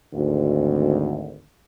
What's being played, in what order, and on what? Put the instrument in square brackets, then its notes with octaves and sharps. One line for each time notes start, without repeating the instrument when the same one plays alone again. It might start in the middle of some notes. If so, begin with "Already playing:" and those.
[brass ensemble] G#1 D2